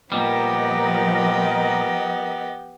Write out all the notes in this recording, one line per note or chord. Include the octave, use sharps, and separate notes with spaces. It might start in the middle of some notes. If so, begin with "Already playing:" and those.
A#2 F3 G3 B3 G4 A#4 D#5